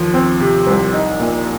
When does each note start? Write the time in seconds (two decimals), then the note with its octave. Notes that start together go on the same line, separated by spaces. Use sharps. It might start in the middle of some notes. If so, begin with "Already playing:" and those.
Already playing: D#2 F3
0.14 C4
0.40 C3
0.67 C2
0.93 D#4
1.20 A#2